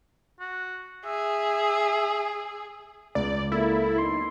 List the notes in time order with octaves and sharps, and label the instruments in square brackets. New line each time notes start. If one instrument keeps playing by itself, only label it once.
[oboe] F#4
[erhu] G#4 [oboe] E5
[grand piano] C#2 [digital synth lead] D5
[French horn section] A#3 [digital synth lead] E4 [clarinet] A4
[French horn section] F#2 B3 D#4 [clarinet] C6